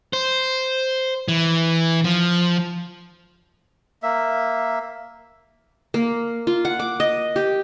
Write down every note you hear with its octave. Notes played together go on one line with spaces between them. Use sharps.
C5
E3
F3
A#3 E5
A#3
F4
F#5
D6
D#5
G4